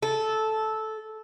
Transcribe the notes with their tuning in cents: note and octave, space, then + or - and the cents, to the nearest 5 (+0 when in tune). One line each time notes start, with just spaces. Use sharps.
A4 -10